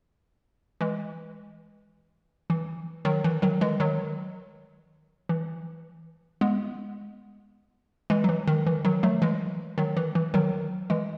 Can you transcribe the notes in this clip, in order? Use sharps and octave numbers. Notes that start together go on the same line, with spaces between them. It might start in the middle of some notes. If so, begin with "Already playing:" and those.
E3 G#3
E3
D#3 F#3
E3
D#3 F#3
E3 G#3
D#3 F#3
E3
G#3 B3
E3 G#3
F#3
E3
D#3
E3
D#3 F#3
F#3 A3
E3 G#3
D#3 F#3
E3
E3
D#3 F#3
E3 G#3